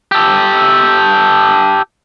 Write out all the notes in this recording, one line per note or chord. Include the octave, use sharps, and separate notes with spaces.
G4 A4